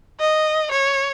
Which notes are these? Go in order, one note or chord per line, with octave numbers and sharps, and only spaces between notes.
D#5
C#5